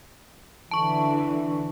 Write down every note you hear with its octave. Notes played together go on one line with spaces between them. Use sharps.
D3 E3 A5 C#6